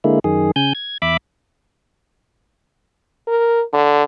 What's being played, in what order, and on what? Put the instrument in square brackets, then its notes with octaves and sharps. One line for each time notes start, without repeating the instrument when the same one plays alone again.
[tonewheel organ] D3 G#3 A#3 E4
F#2 D#3 G#4
C#3 G#5 G6
G#6
E2 E5 B5 D6
[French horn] A#4
D3